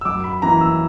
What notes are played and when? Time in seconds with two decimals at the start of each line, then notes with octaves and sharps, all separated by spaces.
0.01 E6
0.05 F#2 D6
0.24 B5
0.42 E3 A#3 A#5
0.61 E6